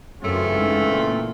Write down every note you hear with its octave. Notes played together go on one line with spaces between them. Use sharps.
F#2 C#3 E3 A3 C4 F4
G#2
A#2